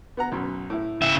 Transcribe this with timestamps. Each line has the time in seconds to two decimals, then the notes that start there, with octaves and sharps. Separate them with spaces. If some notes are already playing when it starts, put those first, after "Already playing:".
0.17 B3 F#5 A#5
0.32 B1 F#2
0.70 A2 E4
1.02 C#3 E5